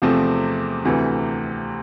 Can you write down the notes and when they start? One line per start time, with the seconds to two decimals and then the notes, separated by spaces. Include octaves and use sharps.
0.02 E2 C3 F3 A3 C4
0.85 D2 C3 E3 A3